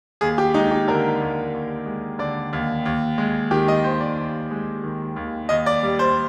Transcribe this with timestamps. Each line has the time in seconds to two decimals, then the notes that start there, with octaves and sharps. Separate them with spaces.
0.21 D#2 G#4
0.38 G4
0.54 G#3 D#4
0.71 G4
0.88 D3 A#4
1.21 D#2
1.53 D#2
1.86 G#3
2.19 D3 D5
2.53 D#2
2.85 D#2
3.18 G#3
3.51 D#3 G4
3.68 D#5
3.84 D#2 C5
4.00 D5
4.17 D#2
4.51 G#3
4.83 D#3
5.16 D#2
5.49 D#2 D#5
5.66 D5
5.83 G3
5.99 C5